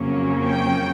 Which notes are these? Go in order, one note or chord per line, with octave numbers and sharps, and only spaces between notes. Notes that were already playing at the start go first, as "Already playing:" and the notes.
Already playing: F2 C#3 F#3 A#3 C#4
G5